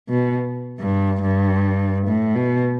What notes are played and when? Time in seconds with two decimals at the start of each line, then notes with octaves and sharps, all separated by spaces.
0.09 B2
0.80 G2
1.22 G2
2.07 A2
2.35 B2